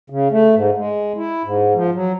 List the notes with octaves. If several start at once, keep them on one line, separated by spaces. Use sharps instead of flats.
C#3
A3
G#2
G#3
E4
G#2
F3
F#3